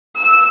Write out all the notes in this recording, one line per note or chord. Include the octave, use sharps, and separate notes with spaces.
E6